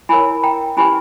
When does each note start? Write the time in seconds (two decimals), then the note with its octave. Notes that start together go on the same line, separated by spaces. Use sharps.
0.09 E4 A#4 C#5 G#5 B5
0.43 G5 A#5
0.77 C#4 E4 G4 B4 G#5 B5